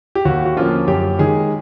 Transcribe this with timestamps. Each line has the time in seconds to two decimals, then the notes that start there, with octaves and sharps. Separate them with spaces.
0.15 G4
0.25 D#2 F#4
0.45 F#4
0.56 D3 F3 A#3 C#4 F4
0.88 F#2 G4
1.19 D#3 G#3 G#4